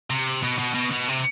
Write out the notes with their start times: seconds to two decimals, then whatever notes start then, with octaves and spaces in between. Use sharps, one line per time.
0.10 C3
0.43 B2
0.58 B2
0.74 B2
0.91 B2
1.08 C3